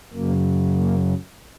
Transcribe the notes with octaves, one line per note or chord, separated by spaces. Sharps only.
F#2 C#3 F#3 A#3
A#3